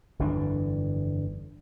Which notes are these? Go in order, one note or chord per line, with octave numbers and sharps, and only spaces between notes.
G1 F2 E3 D4